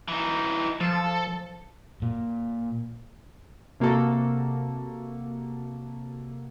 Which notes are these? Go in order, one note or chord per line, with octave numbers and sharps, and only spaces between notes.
E3 D#4
F3 A4
A#2
C3 A#3 F#4 A4